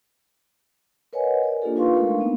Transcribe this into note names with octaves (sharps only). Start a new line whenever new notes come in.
A#4 B4 C#5 D#5 F#5 G#5
A#4 D5
A#3 D4 F4 G4 A4
D#4 F4 B4 F5 C6 C#6
G#3 A3 D4 A#4 F5
A#3 B3 C#4 D#4